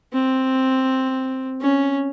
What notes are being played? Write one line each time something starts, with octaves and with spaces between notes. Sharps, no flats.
C4
C#4